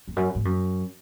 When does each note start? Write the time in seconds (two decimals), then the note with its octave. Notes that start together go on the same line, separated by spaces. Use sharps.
0.08 F2
0.16 F#2
0.35 G#2
0.45 F#2